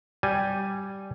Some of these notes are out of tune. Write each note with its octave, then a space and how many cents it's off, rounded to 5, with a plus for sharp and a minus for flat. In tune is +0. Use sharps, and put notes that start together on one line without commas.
G3 -5 G#5 +0